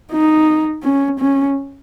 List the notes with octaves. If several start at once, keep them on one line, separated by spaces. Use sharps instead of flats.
D#4
C#4
C#4